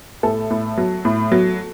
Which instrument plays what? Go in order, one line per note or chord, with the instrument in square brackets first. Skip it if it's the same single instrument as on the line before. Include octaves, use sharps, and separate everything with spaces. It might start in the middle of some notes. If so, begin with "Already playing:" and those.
[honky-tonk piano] A2 A4
A2
F#3
A2
F#3